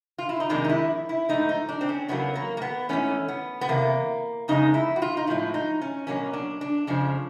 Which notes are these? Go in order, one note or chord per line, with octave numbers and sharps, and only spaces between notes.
F4
E4
D#4
F2 C3 D#3 G#3 D4
D#4
E4
E4
G#2 F3 A3 D#4
D#4
D4
C4
C#4
E2 C#3 F#3 A#3 B3
A#3
A#3
B3
G#2 E3 A3 C#4
B3
B3
E2 C3 A#3
F2 C#3 G#3 D#4
E4
F#4
F4
D#4
A2 F3 G#3 E4
D#4
C#4
B2 F#3 A#3 C#4
D4
D4
F2 C#3 F3